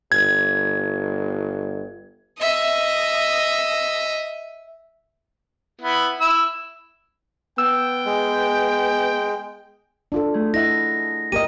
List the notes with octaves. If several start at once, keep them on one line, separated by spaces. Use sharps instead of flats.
G1 G#6
D#5 E5
B3 E4
E4 E6
B3 G5 E6
G#3
D4 F4 A4
A3 G#4
E4 D#5 E5 F#5 A#6
A#3 F4 G4 A#4 D#5 D#7